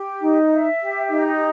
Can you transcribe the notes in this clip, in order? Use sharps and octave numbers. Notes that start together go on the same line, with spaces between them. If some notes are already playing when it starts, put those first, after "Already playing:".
Already playing: G4
D#4
E5
G4
D#4